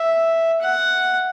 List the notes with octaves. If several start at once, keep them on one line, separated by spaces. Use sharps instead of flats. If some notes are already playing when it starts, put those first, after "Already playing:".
Already playing: E5
F#5